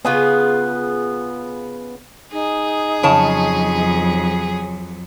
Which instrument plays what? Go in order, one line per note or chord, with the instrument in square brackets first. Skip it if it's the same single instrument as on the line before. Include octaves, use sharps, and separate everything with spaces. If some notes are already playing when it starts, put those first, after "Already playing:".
[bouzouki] C#3 F4 G#4 [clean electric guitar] B3
[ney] D#4 [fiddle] G#4
[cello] F2 F#3 [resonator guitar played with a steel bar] C#3 C#5 A5